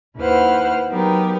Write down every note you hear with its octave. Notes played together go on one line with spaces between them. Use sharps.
D#2 E4 B4 C5 F#5 F6
F#3 B3 D#4 G4 A#4